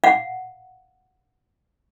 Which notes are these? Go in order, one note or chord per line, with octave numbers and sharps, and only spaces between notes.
F5 F#5